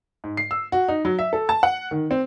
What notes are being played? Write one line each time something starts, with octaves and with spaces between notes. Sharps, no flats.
G#2
C7
E6
F#4
D#4
F#3
E5
A4
A5
F#5
D#3
C4